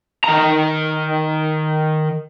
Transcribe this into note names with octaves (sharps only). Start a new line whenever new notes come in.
D#3 A#5